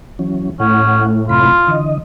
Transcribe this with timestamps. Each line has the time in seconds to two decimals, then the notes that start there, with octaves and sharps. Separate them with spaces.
0.19 E3 F#3 C#4
0.60 A2 C#4 F#5
1.29 F#2 C3 F4 B5
1.67 D3 E3 D#5